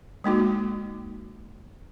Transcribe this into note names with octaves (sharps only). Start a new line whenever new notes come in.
G#3 A#3 D#4 F#4